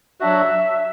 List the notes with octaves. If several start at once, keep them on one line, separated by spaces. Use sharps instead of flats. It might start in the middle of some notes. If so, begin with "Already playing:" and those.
F#3 D4 F#4 E5